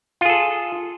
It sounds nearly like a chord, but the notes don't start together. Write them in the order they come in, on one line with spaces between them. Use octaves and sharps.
F4 G#4 A4